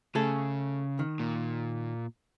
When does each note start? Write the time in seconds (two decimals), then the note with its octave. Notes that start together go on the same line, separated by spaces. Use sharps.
0.15 C#3 A3 G#4 A4
0.99 D#3
1.19 A#2